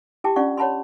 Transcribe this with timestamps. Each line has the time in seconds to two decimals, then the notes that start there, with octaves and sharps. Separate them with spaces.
0.24 E4 G4 G5 A5 D6
0.36 C#4 D4 F4 D5 F#5 C#6
0.57 C#5 F#5 A5 B5 C6